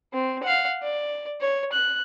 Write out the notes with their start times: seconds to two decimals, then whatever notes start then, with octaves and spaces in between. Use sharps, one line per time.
0.13 C4
0.43 F5 F#5
0.82 D5
1.41 C#5
1.72 F#6